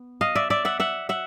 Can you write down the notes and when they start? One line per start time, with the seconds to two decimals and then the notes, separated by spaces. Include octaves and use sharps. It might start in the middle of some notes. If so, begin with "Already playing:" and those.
Already playing: B3
0.21 D#5 F5
0.35 D5 E5
0.50 D5 E5
0.65 E5 F#5
0.80 E5 F#5
1.09 E5 F#5